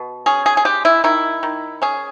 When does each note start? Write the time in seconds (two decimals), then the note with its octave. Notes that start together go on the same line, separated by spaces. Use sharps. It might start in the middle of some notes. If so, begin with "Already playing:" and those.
Already playing: B2
0.26 C#4 G#4
0.46 G#4
0.57 G#4
0.65 G#3 G4
0.85 E4
1.04 D#3 E4
1.43 D#3
1.82 C#4 G#4